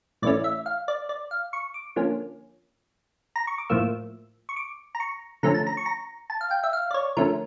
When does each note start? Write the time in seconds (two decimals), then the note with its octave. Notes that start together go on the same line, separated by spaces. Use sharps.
0.22 A2 E3 A3 C#4 D5
0.44 E5
0.66 F5
0.88 D5
1.09 D5
1.31 F5
1.53 C#6
1.74 D6
1.96 D3 F3 A#3 C#4
3.36 A#5
3.47 C#6
3.58 D6
3.70 A2 F3 A#3 E6
4.49 C#6
4.57 D6
4.95 A#5
5.00 C#6
5.43 D3 F3 A3 C#4 A#5
5.54 A5
5.67 A#5
5.77 C#6
5.86 A#5
6.30 A5
6.41 F5
6.51 G5
6.64 E5
6.73 F5
6.91 D5
6.94 C#5
7.17 D3 F3 A3 C#4 A#4